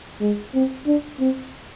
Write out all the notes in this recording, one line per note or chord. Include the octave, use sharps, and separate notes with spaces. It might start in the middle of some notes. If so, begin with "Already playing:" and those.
G#3
C4
D4
C4